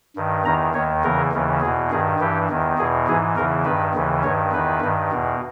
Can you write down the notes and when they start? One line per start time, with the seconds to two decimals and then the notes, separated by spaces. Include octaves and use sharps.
0.16 G2 D#3
0.45 E2 D#3 A#5
0.74 D#2 D#3 C#5
1.04 E2 C#3 E3 A#4
1.33 D#2 C#3 E3
1.61 E2 G#4
1.66 B2
1.91 G2 D#3 G#4
2.20 G2 E3 G4
2.49 E2 D#3
2.78 E2 B2 G#4
3.07 G#2 E3 G#4
3.36 E2 C#3 E3 A#4
3.65 G2 D#3 B4
3.94 D#2 C#3 E3
4.24 G2 D#3 C#5
4.52 E2 D#3 B4
4.81 G2 D#3
5.11 E2 B2